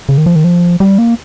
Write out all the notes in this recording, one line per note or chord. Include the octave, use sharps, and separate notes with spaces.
C#3
D#3
F3
D#3
F3
G3
A#3